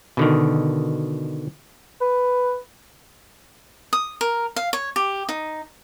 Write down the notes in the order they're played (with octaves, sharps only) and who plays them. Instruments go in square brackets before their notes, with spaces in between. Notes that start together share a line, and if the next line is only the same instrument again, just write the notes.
[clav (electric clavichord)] B2 D3 D#3
[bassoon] B4
[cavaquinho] D#6
A#4
F5
C#5
G4
D#4